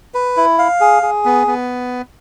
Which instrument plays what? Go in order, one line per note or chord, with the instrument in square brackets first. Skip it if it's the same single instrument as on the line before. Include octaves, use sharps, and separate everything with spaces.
[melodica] B4
E4
F5
G#4
G#4
B3
B3